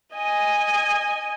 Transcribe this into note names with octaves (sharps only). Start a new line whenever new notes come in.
D#5 G#5